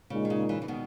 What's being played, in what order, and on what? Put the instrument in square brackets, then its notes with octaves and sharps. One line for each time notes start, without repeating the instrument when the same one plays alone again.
[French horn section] A#2 G#3 D#4 [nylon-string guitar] C#3
[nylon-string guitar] D#3
C#3
C#3 E3
E3
B2 D#3